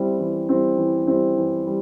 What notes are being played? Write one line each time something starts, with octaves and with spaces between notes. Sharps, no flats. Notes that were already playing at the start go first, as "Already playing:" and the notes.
Already playing: G3 C4 E4
E3
G3 C4 E4
E3
G3 C4 E4
E3
G3